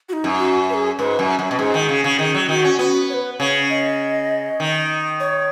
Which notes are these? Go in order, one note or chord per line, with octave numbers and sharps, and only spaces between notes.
F#4
D#4
F#2
F#4
B4
G#4
G#2 B4
F#2
F#2
B2
G#2 G#4
D#3
C#3
C#3
D#3 G#4
F#3
D#3 F#4
C#4
B3 F#4
C#5
B4
C#3 C#5
D#5
D#3
C#5